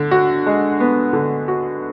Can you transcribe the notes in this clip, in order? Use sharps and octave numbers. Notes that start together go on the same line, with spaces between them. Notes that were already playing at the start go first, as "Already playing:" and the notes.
Already playing: D3
F#4
G#3
B3
D3
F#4